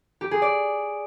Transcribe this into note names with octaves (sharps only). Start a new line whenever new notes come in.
G4
G#4
D5